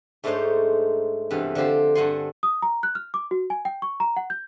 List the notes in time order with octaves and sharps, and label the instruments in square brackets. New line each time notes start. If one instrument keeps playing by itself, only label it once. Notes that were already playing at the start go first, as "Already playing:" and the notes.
[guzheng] G#2 A3 D4 D#4 C5 C#5
G2 C3 E3 B3 A4
D3 F3 C4 G4 C5
G2 A4 F#5 G#5 C6
[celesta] D#6
A#5
F#6
F6
D6
F#4
G#5
G5
C#6
A#5
F#5
G6